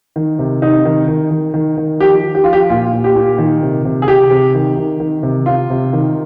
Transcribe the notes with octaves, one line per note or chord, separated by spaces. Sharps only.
D#3
C3
C3 D#4
D#3
D#3
D#3
D#3
D#3
F3 G4
F3
G4
F3 F4
G4
A#2 F4
A#2
G4
A#2
D#3
C3
C3
G#4
C3 G4
C3
D#3
D#3
D#3
C3
C3 F4
C3
D#3